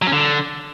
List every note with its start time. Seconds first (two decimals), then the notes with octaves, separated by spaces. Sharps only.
0.02 F#3
0.07 C#4
0.12 D3